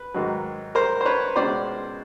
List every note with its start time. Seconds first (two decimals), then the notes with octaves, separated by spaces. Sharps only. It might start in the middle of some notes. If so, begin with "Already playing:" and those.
Already playing: B4
0.14 G#2 D#3 F#3
0.75 A#4 C5
1.01 C5
1.05 B4 C#5
1.36 C#2 B2 G#3 C#4 C5 D5